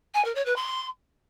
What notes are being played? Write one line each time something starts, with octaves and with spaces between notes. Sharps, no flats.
G#5
A#4
C#5
B4
C6